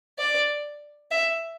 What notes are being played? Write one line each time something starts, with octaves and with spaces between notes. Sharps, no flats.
D5
E5